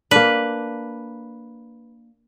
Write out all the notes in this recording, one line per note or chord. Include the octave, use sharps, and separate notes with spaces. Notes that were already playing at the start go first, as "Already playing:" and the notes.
A#3 D4 B4